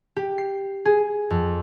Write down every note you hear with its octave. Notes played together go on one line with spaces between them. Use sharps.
G4
C7
G#4
F2